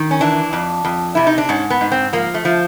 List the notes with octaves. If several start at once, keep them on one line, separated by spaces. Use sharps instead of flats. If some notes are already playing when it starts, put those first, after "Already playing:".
Already playing: D#3
C#4
E3 D4
F2
F2
C3 E4
D#4
D4
G#2 C#4
B3
G#2
C4
F3 A#3
A3
F3